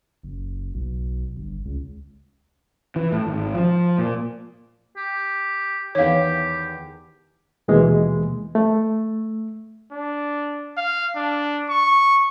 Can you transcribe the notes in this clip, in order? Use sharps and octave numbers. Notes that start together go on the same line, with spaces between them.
F#1
B1
G1
C#2
E3
A2
G#1
F3
A#2
G4
E2 D#3 G4 C#5 F5
D#2 B2 E3 G#3 A#3
A3
D4
F5
D4
C#6